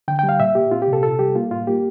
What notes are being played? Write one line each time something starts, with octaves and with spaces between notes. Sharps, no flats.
D3 G5
G5
G3
F5
A#2 E5
A#2 G4
C4 F4
G4
C3
A4
C3 A4
G3 G4
A#3 F4
A2 F4
A#3 G4